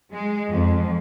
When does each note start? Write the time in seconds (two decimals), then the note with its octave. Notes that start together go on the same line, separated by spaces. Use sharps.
0.12 G#3
0.52 F2